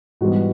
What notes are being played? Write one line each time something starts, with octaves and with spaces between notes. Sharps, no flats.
G#2 E3 G3 B3 F#4